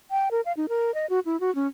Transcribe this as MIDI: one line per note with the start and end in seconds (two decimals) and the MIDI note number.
0.11 0.29 79
0.31 0.41 70
0.45 0.52 77
0.57 0.66 63
0.69 0.94 70
0.94 1.06 75
1.10 1.20 66
1.26 1.39 64
1.40 1.53 66
1.55 1.67 61